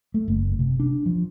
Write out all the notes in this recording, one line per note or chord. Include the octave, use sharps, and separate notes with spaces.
A3
F#1
C3
D4
F3